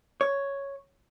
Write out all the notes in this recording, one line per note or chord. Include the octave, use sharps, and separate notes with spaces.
C#5